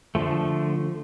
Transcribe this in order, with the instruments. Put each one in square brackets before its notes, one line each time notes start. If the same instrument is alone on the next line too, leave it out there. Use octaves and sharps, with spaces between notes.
[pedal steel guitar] D3 F3 A3